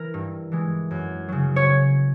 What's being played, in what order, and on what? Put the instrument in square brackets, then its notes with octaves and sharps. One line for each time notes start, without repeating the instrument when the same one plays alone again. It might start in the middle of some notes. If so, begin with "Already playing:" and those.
Already playing: [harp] E3 A#4
G2
E3 G#3
F#2
C#3 F#3
C#5